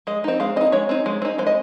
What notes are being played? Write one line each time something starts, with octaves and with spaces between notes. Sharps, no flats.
G#3 D#5
C4 D#4
G#3 F5
C4 D#4 D#5
G#3 C#5
C4 D#4
G#3
C4 D#4
G#3 C5
D#5